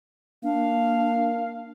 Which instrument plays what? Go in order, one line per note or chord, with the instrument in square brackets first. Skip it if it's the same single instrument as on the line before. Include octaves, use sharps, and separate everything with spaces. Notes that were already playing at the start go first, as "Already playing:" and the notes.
[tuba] A#3 [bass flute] D4 [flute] F5